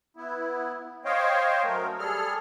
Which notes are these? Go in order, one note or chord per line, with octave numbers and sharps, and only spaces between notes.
B3 E4
C5 C#5 D#5 F5 G5
F#2 A3 A#4
G3 G#4 A4 F6